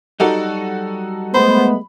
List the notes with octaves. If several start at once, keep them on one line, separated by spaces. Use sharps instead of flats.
F#3 G3 D#4 F#4 G4 A4
G#3 A3 B3 C5 B5